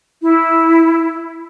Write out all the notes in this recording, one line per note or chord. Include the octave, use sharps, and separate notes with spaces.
E4